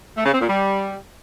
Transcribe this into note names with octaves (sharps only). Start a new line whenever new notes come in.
A3
C#3
C4
A#2
G3